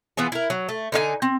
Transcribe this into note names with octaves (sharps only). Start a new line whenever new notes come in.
E3 B3 F4 G#4
E4 A#4
F#3
A3
D3 D#4 G#4 G#5
C4